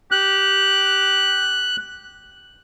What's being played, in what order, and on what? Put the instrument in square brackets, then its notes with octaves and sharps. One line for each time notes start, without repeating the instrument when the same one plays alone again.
[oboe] G4 [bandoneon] F#6